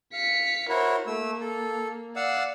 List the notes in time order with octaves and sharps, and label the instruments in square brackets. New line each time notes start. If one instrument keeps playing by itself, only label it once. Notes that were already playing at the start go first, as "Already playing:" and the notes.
[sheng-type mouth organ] F5 [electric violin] B6 C#7
[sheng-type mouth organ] E4 F#4 C#5 [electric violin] A#4 C5
[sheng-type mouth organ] A3 E6 [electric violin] A#3
[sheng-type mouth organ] A4
[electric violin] D5 [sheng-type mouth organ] F5 F#5 E6